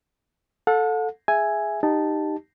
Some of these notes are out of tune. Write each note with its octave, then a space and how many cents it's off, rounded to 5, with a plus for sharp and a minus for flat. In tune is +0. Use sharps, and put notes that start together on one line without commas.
A4 +0 F#5 -40
G#4 +0 E5 +5 G#5 +0
D#4 -10 G4 +0 A5 +0